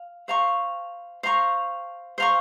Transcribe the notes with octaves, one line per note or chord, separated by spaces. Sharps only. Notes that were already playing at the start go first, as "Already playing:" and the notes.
Already playing: F5
C5 F5 A#5 C#6
C5 F5 A#5 C#6
C5 F5 A#5 C#6